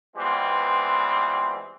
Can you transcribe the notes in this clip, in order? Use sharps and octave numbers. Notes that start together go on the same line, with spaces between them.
E3 G3 G#3 B3 C4 F4